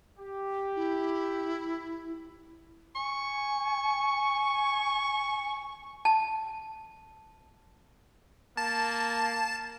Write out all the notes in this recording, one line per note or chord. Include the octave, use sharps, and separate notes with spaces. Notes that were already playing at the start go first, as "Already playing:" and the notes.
G4
E4
G#5 C#6
A5
A#3 A5